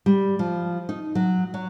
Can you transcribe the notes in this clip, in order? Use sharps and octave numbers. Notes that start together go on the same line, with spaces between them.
G3
F3
D#4
F#3
F#3